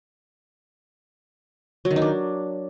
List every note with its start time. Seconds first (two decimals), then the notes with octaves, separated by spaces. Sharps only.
1.85 F#3
1.91 D#3
1.96 D#4
2.02 D4